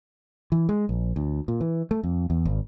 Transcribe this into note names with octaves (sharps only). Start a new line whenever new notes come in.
E3
G#3
A#1
D2
A#2
E3
A3
F2
E2
G#1